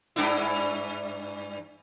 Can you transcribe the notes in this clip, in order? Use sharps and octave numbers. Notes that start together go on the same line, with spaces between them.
G2 D4 E4